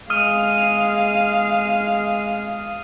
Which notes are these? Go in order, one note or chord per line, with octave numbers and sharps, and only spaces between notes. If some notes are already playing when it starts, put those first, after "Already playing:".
G#3 F5 D#6 F6 D#7